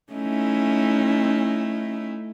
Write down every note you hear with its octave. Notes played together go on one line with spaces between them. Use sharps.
A3 C#4 D#4 E4